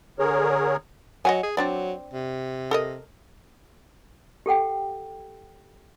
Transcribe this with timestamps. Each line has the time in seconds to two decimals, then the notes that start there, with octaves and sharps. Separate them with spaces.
0.19 D3 G#4 A#4 C#5
1.25 F#3 D#5 F#5 G#5
1.43 G#4
1.57 F#3 C4 D4 D5
2.13 C3
2.71 A4 A#4 D#5
4.46 G4 A4 F#5 G5